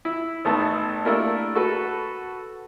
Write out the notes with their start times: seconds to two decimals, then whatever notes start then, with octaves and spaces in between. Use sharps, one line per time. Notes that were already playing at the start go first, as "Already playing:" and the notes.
0.05 E4
0.45 G#1 A3 B3 D#4 A5
1.05 A3 A#3 D4 E4 G4 A#4
1.55 F#4 A4 B4